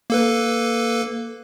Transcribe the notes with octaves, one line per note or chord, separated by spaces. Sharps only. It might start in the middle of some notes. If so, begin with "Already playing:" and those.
A#3 A4 B4